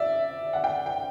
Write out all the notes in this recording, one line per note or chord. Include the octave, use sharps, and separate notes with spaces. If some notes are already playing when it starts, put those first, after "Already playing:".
Already playing: D5 E5
F#5
G5
G5